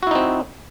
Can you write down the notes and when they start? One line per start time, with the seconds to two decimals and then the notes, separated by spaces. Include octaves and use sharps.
0.03 F#4
0.07 E4
0.11 D#4
0.15 C4